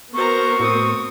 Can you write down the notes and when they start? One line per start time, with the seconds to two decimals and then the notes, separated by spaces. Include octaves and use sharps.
0.14 B3 F#4 A#4 C5 A#5 C#6
0.60 A2 C4 D#6